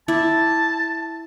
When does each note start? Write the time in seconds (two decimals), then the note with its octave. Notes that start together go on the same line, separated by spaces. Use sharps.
0.08 E4 D5 A5